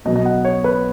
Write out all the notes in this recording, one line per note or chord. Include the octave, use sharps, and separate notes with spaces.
B1 B2 F#3 B3 D#5
D#5
F#5
C#5
B4